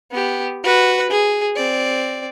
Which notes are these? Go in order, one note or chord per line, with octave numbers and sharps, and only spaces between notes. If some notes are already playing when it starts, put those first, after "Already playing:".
B3 G4
F#4 B4
G#4
C4 D5